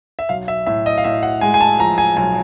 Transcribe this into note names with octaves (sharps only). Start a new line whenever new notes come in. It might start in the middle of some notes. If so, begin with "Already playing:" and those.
E5
B1 F5
E5
A2 E5
D#5
F5
A2 E5
F#5
G#3 G#5
G#5
A5
F3 A#5
G#5
B1 G#5